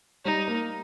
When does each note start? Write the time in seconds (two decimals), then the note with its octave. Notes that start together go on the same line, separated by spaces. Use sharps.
0.25 G3 D#4
0.48 A#3